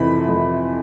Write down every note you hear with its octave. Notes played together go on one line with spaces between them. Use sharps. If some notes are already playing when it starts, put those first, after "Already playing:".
Already playing: F2 C3 E3 B5
F2